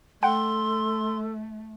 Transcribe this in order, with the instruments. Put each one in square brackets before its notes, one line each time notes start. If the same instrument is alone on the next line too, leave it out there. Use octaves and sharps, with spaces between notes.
[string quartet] A3 [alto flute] A4 [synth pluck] F#5 G5 [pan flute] C6